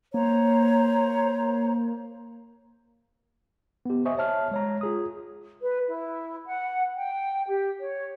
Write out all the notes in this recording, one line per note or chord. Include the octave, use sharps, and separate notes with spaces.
A#3 C5 C#5 A#5
B3 G4
C5 D#5 E5 G#5 C#6 D#6
C#5 E5 A5 F6
G#3 C#5 A#5
F4 G#4 D#6
B4
E4
F#5
G5
G4
C#5